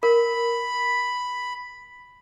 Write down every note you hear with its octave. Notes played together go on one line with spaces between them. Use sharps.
A#4 B5